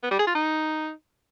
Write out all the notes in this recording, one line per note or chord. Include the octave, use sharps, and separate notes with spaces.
B3
G3
G#4
F4
D#4